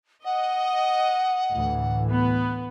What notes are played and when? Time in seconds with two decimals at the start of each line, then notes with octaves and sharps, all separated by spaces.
0.24 D#5 F#5
1.53 D2 A2 E3
2.10 B3